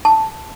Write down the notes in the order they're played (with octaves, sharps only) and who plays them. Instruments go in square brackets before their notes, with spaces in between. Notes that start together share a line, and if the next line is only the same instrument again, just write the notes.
[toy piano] A5